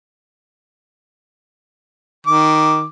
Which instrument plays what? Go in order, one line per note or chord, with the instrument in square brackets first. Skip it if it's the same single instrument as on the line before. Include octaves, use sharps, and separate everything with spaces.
[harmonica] D#3 D6